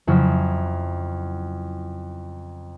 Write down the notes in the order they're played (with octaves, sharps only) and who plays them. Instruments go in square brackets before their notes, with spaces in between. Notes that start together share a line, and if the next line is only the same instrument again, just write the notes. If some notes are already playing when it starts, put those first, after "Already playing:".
[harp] F2 C#3 F#3 E4 F6